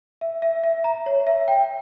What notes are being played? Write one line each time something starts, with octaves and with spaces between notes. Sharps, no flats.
E5
E5
E5
A#5
C#5
E5
G5